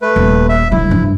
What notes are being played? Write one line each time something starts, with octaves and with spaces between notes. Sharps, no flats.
A3 B4
D#1
E5
D3 F#3 E4
G2 F3